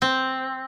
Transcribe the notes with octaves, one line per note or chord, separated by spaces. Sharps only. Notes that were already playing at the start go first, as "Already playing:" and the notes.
C4